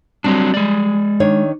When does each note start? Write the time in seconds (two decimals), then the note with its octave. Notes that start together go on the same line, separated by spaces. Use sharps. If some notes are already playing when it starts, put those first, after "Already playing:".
0.24 F#3 G3 C4 D4
0.54 G#3 D5
1.20 D#3 D4 C#5